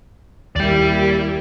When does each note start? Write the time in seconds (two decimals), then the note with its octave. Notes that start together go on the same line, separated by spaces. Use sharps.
0.56 D#2 G3 A#3 E4 G4 D5 G5